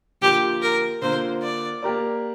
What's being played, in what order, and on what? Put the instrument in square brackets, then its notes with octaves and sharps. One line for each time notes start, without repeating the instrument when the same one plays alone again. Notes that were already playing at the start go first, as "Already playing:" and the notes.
[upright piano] D3 F3 A#3 F4 [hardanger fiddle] G4
[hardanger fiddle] A#4
[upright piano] D3 A#3 F4 A#4 [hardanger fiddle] C5
[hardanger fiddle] D5
[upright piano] A#3 G4 A#4 D5